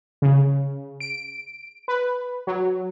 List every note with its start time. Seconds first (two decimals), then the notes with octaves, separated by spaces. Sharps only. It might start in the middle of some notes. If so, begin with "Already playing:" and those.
0.22 C#3
1.00 D7
1.88 B4
2.47 F#3